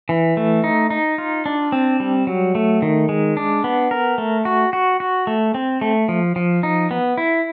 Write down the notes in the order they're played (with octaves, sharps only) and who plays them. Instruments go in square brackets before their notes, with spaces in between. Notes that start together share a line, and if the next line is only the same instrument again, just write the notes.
[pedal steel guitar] E3
A3
D#4
D#4
F4
D4
C4
G3
F#3
A3
D#3
G#3
D4
B3
A#4
A3
F#4
F#4
F#4
A3
C4
A3
F3
F3
D#4
B3
E4